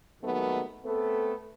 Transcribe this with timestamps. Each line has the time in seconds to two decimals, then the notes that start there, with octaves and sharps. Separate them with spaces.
0.22 D#2 D#3 F#3 G#3 A3 B3
0.85 A3 B3 C4 A4